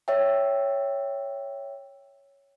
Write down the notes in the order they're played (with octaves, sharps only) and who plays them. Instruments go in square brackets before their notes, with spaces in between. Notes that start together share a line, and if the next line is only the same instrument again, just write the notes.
[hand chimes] C#5 E5 G5